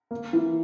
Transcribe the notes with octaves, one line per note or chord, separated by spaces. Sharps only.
A#3
E3